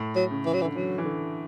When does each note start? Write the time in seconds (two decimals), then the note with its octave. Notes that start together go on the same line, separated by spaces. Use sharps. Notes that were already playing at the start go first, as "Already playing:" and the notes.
Already playing: A2
0.15 F#3
0.31 C#3
0.46 E3
0.53 F#3
0.61 E3
0.65 D3
0.75 E3 F#3
0.98 E3
1.05 D3